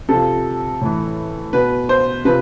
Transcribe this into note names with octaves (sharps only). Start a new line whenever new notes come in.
C3 F3 A4
A2 E3
B2 B4
C5
C3 F3 B4